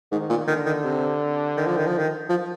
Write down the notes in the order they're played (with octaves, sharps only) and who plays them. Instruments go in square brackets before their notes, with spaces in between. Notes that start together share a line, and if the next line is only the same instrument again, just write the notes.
[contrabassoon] G#2 [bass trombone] D#3
[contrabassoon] A#2
[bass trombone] D3 [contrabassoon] D#3
[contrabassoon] D#3
C3
D#3
F3
D#3
F3
D#3
F3